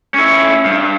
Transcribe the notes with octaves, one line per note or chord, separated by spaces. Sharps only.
C#4 E4
G2